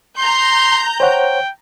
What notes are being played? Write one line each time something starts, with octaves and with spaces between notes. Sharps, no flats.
A#5 C6 G6
C5 C#5 F#5 G5